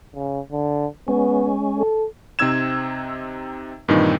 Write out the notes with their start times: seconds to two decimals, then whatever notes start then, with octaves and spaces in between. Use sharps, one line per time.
0.15 C#3
0.52 D3
1.08 G#3 B3 C#4
1.79 A4
2.39 C3 C4 D#4 E6 G#6 E7
3.88 G2 A#2 D#3 E3 C4 D#4